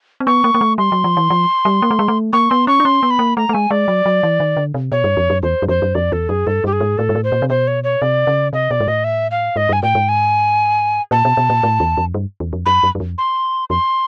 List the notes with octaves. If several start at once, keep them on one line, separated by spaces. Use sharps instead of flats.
C4
B3 C#6
A#3
A#3
A3
G3 C6
F#3
F3
E3
F3
G3
A#3
A3
G#3
A3
A#3 C#6
B3 C6
C#4 C#6
D4
C#4 C6
B3
B5
A#3
A3 A#5
A3
G#3 G#5
G#3 D5
F#3
F#3
E3
D#3
D3
C3
B2 C#5
G2
F2
F#2
E2 C5
F#2
F2 C5
F#2
F2 D5
E2 A4
F#2 G#4
G2 A4
G2 G4
G#4
G#2
A2 A4
G#2
A2
C5
A#2
C3
B2 C5
C#5
C#5
C3 D5
C#3
C3 D#5
B2 D5
G#2
A2 D#5
E5
F5
G#2 D#5
G2 G#5
A2 G5
G#2
G#5
A#2 A5
B2
B2
A#2
A2
E2
F2
G2
E2
F2
F#2 B5
F#2
F#2
F2
C6
F2 C6